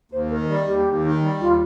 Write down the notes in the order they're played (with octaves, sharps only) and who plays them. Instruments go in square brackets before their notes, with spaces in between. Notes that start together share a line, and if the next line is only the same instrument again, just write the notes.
[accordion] D#2 [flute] C5
[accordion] D#3 [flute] A#4
[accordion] G3 [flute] A#4
[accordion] D#2 [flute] G4
[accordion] D#2
D#3
G3
[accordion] D#2 [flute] F4